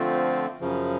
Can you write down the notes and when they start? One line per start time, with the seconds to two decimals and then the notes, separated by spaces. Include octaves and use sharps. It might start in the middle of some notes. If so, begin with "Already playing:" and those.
Already playing: D3 F3 A3 C4 F4
0.60 F#2 C#3 F3